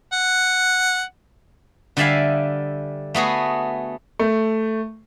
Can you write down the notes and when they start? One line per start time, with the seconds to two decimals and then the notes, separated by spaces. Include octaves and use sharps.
0.13 F#5
1.97 D3 G3 D5 E5 F5 G#5
3.14 A3 B3 F#4 G#4
4.19 A3